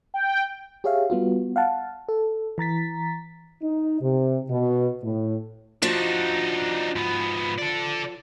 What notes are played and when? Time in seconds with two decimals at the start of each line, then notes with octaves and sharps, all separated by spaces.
0.14 G5
0.84 G4 G#4 C#5 E5 F5
1.10 G3 B3 F4 F#4
1.56 F5 F#5 A5
2.09 A4
2.58 E3 A#5 A6 B6
3.62 D#4
4.01 C3
4.50 B2
5.03 A2
5.82 F3 D4 D#4 F#4
6.96 G#2 B3
7.59 A4 D5